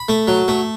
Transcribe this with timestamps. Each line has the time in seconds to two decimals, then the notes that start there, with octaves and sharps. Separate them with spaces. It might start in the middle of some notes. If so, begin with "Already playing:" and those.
Already playing: B5
0.09 A3
0.28 F#3
0.48 A3